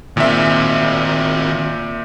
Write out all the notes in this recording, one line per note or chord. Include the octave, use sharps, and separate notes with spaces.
A#2 D#3 C4 E5